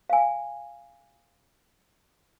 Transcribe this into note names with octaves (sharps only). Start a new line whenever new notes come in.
F5 G#5